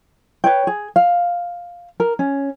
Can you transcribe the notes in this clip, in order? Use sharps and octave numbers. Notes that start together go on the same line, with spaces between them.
B4 C#5 G5
G#4
F5
A#4
C#4